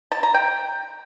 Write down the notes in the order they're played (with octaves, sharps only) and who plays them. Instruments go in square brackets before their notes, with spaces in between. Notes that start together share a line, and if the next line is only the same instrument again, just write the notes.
[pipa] A5
A#5
G5